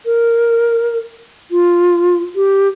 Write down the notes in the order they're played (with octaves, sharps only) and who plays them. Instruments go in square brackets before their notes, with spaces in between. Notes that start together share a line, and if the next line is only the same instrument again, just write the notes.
[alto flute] A#4
F4
G4